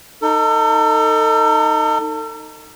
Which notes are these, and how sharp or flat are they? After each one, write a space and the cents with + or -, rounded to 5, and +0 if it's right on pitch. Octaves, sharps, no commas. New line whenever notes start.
D#4 +0 A4 +35